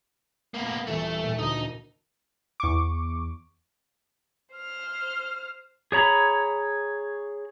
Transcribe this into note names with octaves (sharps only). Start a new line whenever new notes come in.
A#3 B3
D#1 E3 A3 C7
A#2
D2 D#4
E2 C#6 D6
C5 F6
G#4 C#5 A#5 B5